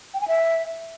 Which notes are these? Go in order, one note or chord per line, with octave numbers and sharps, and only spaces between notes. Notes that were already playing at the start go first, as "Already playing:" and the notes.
G5
G#5
E5